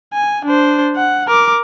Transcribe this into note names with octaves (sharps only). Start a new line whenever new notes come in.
G#5
D4 C5
F#5
A#4 D6